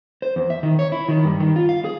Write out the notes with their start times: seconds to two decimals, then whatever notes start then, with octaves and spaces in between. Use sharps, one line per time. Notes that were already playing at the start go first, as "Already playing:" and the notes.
0.22 C5
0.36 E2
0.50 E5
0.63 D#3
0.79 C#5
0.92 E4
1.09 D#3
1.24 G2
1.40 D#3
1.56 F4
1.69 F5
1.84 G#4